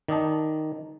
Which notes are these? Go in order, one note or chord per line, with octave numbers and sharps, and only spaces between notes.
D#3 D5 D#5 A5